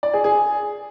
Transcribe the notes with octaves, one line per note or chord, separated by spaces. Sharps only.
D5
G#4
G#4